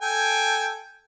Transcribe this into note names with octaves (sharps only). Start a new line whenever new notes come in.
A4 G5 G#5